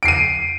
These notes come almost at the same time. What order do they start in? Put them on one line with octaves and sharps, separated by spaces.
D7 C7 D#7